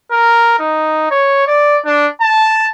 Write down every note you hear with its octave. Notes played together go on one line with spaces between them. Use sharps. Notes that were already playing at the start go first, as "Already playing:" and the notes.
A#4
D#4
C#5
D5
D4
A5